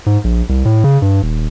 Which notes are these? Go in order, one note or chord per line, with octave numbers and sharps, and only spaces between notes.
G#2
A#1
C2
A2
C#3
G2
D#1